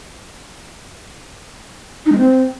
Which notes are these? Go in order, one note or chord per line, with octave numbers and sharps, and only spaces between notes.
D#4
G#3
C4